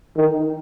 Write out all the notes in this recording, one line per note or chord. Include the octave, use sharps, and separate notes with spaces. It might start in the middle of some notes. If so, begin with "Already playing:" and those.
D#3